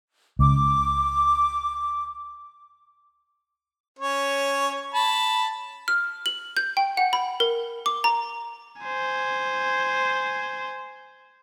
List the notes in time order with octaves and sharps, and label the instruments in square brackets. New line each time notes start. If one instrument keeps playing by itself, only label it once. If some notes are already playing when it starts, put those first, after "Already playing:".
[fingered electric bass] C#2 [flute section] D6
[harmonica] C#4 C#5
A5 B5
[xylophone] F6
F#7
G6
G5
F#5
B5
A#4
D6
A#5
[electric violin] C5 G#5